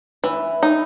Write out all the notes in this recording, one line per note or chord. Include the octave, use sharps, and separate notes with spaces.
E3 E4
D#4